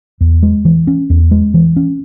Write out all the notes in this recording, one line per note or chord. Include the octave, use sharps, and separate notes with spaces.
E2
G#3
E3
C#4
E2
G#3
E3
C#4